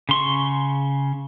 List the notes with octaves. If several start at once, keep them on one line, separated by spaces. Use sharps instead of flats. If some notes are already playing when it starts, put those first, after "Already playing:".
C#3 C6 C#6